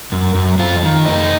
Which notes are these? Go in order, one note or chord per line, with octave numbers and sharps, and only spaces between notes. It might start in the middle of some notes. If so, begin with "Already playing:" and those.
F#2
F#2
F2 F4
D#3
F2 D#4